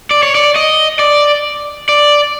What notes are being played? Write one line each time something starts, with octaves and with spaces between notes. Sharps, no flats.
D5
C#5
D5
D#5
D5
D5